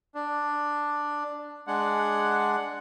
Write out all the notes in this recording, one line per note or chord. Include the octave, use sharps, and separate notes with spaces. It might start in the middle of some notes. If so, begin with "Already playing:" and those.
D4
G#3 D4 F#5